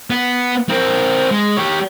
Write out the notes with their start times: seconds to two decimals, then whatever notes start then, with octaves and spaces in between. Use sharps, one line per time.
0.10 B3
0.69 C4 A#4
1.31 G#3
1.57 G4 C#5